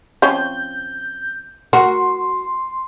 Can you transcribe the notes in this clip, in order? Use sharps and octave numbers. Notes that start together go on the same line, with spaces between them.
F3 C4 C#4 G6
F#4 A#4 C6